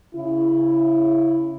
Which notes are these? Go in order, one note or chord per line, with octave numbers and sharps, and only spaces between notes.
C#3 E4